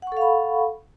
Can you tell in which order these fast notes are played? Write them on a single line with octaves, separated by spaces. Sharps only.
F#5 C#6 A4 F5 B5